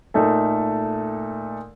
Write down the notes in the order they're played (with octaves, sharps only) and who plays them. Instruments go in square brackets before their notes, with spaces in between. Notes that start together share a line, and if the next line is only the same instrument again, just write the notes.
[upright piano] A#2 A3 D#4 A4